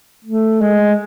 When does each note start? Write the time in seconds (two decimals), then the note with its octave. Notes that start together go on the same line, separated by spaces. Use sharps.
0.25 A3
0.61 G#3